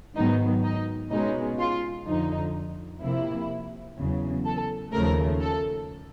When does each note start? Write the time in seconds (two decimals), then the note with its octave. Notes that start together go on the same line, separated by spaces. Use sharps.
0.15 G#2 D#3 F#3 B3 D#4
0.63 D#4
1.10 B2 G#3 C#4 D#4
1.59 F4
2.06 F2 D3 F3 D#4
3.01 C3 F3 A#3 E4
3.98 E2 C#3 F#3
4.45 A4
4.92 D#2 C#3 F3 A3 A#4
5.40 A4